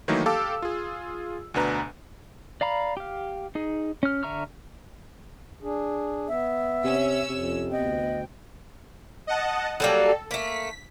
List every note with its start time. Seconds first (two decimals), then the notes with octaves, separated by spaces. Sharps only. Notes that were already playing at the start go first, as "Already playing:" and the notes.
0.08 D#3 E3 F#3 A3 A#3 D#4
0.26 G4 A4 F5 A5 D6 E6
0.62 F4 G#4
1.54 D2 B2 D4 B4 A#5
2.61 D5 F5 A#5 B5
2.97 G4 F5
3.55 D#4 G#4
4.03 C#4 F6
4.23 D3 E5 A#5 C#6 F6
5.62 D4 G#4
6.28 B3 E5
6.84 C3 C#4 E6
7.30 F2 C3
7.72 D2 B3 D#5 G5
9.27 D#5 F#5 A5
9.80 F#3 G3 A#3 A4
10.31 A3 A#3 B6